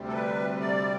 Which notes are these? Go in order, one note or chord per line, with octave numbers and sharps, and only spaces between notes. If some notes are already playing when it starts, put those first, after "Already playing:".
Already playing: D2 C3 G3
A4
B4
D5